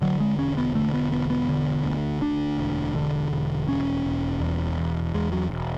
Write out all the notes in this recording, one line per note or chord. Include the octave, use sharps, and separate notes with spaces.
D3 F#3
G#3
E1 C#4
B3
D3 A3
B3
E1 B3
B3
D3
D2
D2 D4
E1
D3
E1
E1 C#4
E1
E2
E1
E2 G#3
F#3
E1